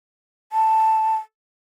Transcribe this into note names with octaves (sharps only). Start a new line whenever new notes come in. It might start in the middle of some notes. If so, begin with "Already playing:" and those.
A5